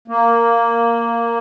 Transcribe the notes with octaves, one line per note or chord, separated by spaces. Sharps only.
A#3